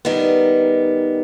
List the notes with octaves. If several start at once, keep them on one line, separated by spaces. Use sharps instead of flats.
D#3 G3 B3